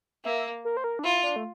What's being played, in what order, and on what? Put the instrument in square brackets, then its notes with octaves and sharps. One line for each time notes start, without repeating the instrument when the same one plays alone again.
[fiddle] A#3 [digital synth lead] E5
[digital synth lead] A#4
C5
A#4
D4
[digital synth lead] E4 [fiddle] F4
[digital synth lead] D4
A3